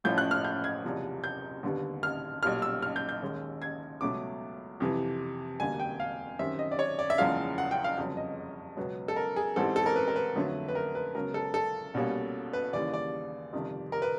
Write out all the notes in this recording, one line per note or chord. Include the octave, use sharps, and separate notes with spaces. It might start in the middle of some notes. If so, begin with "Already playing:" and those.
A1 A2 F3 A3 C#4 G6
F#6
F6
G6
G#6
F#1 E2 C3 F3
G6
D#2 D3 G3 B3
F6
B1 A#2 G3 F6
E6
F6
G6
G6
D#2 D#3 G#3 C#4
G#6
C#2 B2 F#3 A3 D6
F2 C3 E3
E1 D2 D3 G3 A#3 G#5
G5
F5
F#2 D#3 G3 C4 E5
D#5
D5
C#5
D5
E5
F#1 E2 C#3 F3 G#3 F5
F#5
G5
F5
G1 F2 C#3 F#3
D#5
C#2 B2 F#3 B3
A4
A#4
G#4
A1 G#2 E3 G3 C4 A4
A4
A#4
B4
A#4
B4
F2 D3 F#3 A3
B4
A#4
B4
C#2 C#3 F#3 B3 A#4
A4
A4
C2 B2 G3 A#3 C#4
B4
D#2 C#3 E3 G3 A#3 D5
D5
G1 F2 C3 D#3
A#4
B4